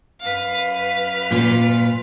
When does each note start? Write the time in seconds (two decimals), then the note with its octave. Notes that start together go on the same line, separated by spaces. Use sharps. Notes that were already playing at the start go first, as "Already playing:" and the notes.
0.21 F#2 B4 F5
1.31 A#2 F4 F5